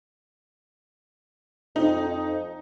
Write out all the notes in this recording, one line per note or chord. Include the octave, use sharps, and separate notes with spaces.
F2 D#4